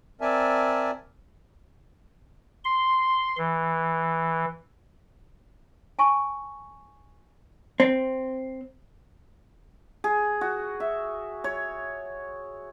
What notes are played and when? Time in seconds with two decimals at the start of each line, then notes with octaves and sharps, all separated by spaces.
0.21 C4 A#4 D5 E5 G#5 A5
2.65 C6
3.38 E3
5.99 G#5 A5 C#6
7.80 C4
10.04 G#4
10.41 F#4
10.80 E5
11.44 C#5